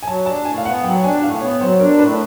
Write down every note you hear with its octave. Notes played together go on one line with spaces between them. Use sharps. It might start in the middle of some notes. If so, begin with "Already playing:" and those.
G#5
F#3 A5
D4 A5
A2 G#5
F5
B3 F#5
F#3 G5
D4 G#5
A2 F5
B3 C#5
F#3 C5
D4 A#4
A2 B4